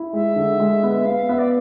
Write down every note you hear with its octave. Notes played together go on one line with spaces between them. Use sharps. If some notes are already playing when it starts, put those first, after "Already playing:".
Already playing: E4
G#3 E5
D3
G#3
B3
B3 F5
B3 E5
D5